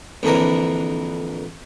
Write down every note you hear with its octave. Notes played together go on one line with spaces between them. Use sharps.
A#1 F2 D3 E3 A#4